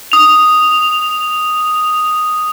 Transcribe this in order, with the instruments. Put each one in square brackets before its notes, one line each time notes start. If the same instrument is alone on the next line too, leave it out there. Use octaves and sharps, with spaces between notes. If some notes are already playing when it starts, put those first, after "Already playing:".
[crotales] D#6 F7